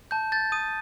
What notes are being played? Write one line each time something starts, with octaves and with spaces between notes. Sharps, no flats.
A5 G6
G6 A6
D#6 D#7